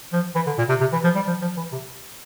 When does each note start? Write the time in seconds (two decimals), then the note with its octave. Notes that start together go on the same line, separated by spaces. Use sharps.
0.13 F3
0.35 E3
0.47 D3
0.58 A#2
0.69 C3
0.81 C3
0.93 E3
1.04 F3
1.15 G3
1.27 F3
1.42 F3
1.57 E3
1.72 C3